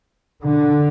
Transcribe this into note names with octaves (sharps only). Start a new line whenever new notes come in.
D3